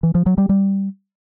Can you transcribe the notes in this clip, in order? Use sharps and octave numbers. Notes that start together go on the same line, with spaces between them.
E3
F3
F#3
G3
G3